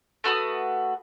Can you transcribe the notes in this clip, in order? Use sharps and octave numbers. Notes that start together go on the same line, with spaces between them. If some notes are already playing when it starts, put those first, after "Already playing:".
A3 F#4 B4 D#6